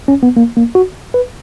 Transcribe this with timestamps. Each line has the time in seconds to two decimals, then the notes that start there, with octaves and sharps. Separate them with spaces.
0.08 C#4
0.23 B3
0.37 A#3
0.57 A#3
0.75 F#4
1.14 B4